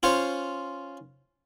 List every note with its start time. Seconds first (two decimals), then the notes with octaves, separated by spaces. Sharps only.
0.03 C#4 F4 C5 C#5